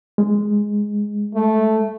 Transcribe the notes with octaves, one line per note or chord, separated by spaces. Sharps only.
G#3
A3